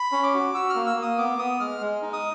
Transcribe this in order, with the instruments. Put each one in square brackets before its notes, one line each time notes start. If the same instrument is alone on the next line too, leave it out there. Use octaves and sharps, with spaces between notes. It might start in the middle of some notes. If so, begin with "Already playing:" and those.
Already playing: [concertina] B5
C#4
D6
F#4
F#4 E6
F6
A#3
E6
A#3 D#6
B3 D6
B3 D#6
G#3 F6
G#3
D#4
D#6